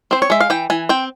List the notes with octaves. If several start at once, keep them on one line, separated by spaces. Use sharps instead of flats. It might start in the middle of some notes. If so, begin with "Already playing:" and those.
C4 C5
C#5
G#3 E5
F5
E3 G5
E3 G#5
C4 G5